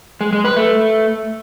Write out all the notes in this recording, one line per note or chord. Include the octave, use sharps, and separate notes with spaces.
G#3
G#3
B4
A3